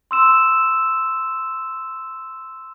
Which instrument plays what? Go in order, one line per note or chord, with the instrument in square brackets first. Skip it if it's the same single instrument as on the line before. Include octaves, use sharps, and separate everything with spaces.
[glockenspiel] C6 E6 E7